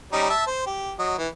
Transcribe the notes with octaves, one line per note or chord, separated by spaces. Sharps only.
G3 C#4 D#4
E5 A5
C5
G4
F#3 D#5
E3